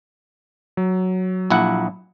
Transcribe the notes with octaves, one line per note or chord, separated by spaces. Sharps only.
F#3
A#1 E4 F#5